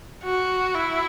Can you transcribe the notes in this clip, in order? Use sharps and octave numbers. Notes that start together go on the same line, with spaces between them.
F#4
E4